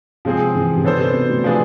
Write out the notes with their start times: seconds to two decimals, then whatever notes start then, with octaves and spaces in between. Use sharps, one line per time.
0.25 C3 F3 G#3 C4 G#4
0.55 E3
0.77 C3
0.84 D3 B3 D4 A4 C5
0.99 C3
1.14 B2
1.29 A2
1.44 F3 B3 D4 G#4